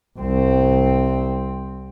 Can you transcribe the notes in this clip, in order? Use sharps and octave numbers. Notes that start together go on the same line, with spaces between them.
C2 C4